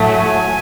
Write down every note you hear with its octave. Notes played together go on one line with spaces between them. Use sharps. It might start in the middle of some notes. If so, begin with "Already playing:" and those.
Already playing: A2 F#3 A3
G#5